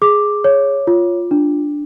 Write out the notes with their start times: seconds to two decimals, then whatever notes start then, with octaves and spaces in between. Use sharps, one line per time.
0.02 G#4 D6
0.44 C#5
0.87 F4
1.31 D4